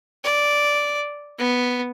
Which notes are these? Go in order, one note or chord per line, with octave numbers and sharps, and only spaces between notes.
D5
B3